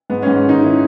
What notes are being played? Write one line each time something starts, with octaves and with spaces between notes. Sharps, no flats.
G#2 B3
G#2 C#4
C#4
D#3 D#4
D#3 E4